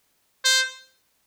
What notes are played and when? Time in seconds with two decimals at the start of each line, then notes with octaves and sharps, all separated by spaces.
0.45 C5